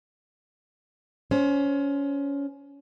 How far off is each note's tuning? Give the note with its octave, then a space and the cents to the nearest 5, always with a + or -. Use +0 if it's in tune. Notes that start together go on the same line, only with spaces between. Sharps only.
C#4 +20 C5 +15